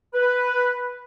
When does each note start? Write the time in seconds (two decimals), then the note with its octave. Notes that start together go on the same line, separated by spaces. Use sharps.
0.14 B4